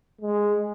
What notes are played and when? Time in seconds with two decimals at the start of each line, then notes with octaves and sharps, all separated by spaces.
0.21 G#3